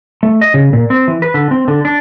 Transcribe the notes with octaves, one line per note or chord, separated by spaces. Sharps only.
A3
D#5
C#3
A#2
C4
E3
B4
D3
C4
D3
D4